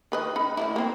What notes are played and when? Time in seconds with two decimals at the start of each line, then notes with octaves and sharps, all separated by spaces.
0.12 D#3 B4 D#5
0.36 C#3 D#4 B5
0.57 D#3 A3 E4
0.76 A#3 C4